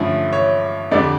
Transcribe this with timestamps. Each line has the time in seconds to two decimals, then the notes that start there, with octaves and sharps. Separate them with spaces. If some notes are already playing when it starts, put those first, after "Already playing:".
Already playing: G2 D3 F3 A3 C#4
0.33 C#5
0.92 F2 D3 G3 D5